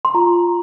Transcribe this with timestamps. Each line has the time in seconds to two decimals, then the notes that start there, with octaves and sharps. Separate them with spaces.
0.05 C6
0.14 F4 A#5